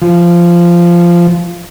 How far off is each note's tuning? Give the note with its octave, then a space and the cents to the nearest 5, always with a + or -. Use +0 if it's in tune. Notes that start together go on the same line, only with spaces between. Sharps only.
F3 -15